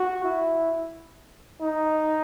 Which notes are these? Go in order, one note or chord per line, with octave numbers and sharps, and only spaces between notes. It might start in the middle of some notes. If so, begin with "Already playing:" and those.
Already playing: F#4
E4
D#4